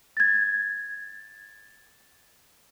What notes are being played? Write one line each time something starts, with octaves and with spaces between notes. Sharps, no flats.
G#6 A6